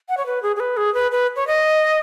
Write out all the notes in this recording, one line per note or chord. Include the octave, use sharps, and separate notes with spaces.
F#5
C#5
B4
G#4
G#4
B4
G#4
B4
B4
C#5
D#5